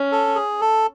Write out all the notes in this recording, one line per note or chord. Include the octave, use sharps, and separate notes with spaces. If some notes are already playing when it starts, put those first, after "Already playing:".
Already playing: C#4
A4
G#4
A4